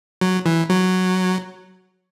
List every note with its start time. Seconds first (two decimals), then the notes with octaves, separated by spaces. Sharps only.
0.21 F#3
0.46 E3
0.70 F#3